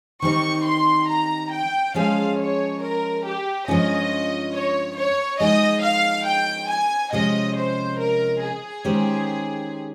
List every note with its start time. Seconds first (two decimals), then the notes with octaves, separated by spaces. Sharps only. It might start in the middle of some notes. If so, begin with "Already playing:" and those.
0.22 D#3 G3 C4 D#4 C#6
0.66 C6
1.09 A#5
1.52 G5
1.94 F3 G#3 C#4 G#4 C5 F5
2.38 C#5
2.81 A#4
3.25 G4
3.68 G2 F3 G#3 C#4 F4 D#5
4.53 C#5
4.96 C#5
5.40 F3 G#3 D#4 G#4 D#5
5.83 F5
6.26 G5
6.69 G#5
7.13 C3 F3 G#3 C#4 D#5
7.56 C5
7.99 A#4
8.42 G#4
8.84 D#3 G#3 C#4 G4 C5